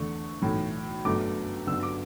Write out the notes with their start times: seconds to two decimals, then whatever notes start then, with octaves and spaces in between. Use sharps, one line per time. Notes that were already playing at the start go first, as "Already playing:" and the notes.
Already playing: E2 D3 A3 C#6
0.42 B1 A2 E3 A3
1.05 G1 F#2 D3 A3 D6
1.67 G1 F#2 D3 E6
1.83 D6